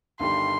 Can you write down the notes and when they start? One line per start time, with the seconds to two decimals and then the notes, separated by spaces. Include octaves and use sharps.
0.20 G1 G2 D#3 G3 C6